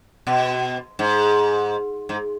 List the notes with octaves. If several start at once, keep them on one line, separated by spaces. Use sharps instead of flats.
B2
G#2
G#2